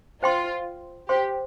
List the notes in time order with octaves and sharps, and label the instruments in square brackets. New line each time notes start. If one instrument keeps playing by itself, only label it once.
[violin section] F4 [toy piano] C5 G5 C6
[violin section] G4 [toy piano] C5 G5 C6